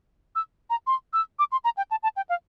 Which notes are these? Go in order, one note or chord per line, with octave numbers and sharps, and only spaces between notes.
E6
A#5
C6
E6
D6
C6
A#5
G5
A5
A5
G5
F5